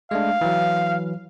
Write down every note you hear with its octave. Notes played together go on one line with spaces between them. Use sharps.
G#3 A3 D4 F5
E3 F#3